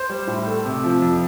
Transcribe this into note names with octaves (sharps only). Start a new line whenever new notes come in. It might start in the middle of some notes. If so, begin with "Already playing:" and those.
Already playing: C5
G3
A2
A3
C3
F3
F2